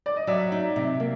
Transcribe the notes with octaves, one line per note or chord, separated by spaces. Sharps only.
D5
D#5
F#3 D5 E5
D#4
C3
A#3